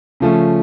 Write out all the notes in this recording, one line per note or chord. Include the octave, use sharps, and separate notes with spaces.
C#3 F3 A3 C#4